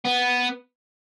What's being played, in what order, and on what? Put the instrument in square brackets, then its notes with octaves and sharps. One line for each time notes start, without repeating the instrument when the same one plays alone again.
[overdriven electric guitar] B3